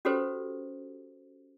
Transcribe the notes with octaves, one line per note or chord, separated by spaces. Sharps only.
C#4 F#4 G4 A4 B4 C5